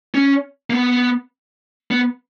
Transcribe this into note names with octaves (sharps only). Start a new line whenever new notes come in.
C#4
A#3
B3
B3